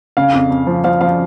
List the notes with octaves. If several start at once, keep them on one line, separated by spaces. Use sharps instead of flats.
C#3 F5
F2
F2
F3
F3 F5
F3 F5